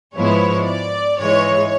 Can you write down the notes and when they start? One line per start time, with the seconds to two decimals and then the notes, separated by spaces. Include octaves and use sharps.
0.16 G#2 F3 G#3 B3 E4 C#5
0.67 D5
1.19 G#2 E3 G#3 C#5